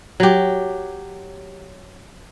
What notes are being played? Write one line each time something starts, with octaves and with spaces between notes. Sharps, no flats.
F#3 G4